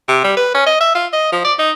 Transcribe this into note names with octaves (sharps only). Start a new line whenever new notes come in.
C3
G3
B4
C#4
D#5
E5
F4
D#5
F3
D5
D#4